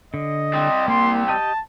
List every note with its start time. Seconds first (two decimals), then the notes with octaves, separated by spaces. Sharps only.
0.14 D3 D#5
0.53 G3 C4
0.88 A#3 C6
1.28 G4 D#5 G5 A5